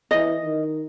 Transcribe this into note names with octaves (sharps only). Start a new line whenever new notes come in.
E3 D#5
D#3